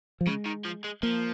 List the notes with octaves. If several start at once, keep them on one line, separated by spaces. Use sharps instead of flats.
F3
C#3 G#3
D#3
F3
G#3
F3 A#3